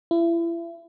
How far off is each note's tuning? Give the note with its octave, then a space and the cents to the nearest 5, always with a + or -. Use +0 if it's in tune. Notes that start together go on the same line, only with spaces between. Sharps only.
E4 +35